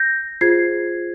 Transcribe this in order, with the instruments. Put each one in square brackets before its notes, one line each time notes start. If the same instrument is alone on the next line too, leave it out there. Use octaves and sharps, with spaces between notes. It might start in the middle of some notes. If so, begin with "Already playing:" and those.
Already playing: [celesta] G6 A#6
F4 G#4 C5 G#6 C7